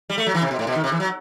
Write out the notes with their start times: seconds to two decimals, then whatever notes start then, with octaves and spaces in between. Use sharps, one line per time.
0.10 G3
0.18 A3
0.26 F#3
0.34 E3
0.42 C3
0.51 B2
0.59 A2
0.67 B2
0.75 D#3
0.84 C3
0.92 E3
1.00 F#3